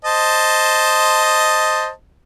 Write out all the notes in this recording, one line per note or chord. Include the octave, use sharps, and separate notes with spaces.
C5 D#5 A5